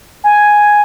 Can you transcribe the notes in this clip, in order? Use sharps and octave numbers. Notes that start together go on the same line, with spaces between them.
G#5